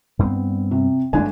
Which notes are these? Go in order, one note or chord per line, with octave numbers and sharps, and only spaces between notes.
G2 B3 C4
C3
G1 D3 G#3 A3 D4 G#5